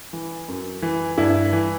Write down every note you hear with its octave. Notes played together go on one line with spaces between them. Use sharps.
E3
F#2
E3
G2 E4
E3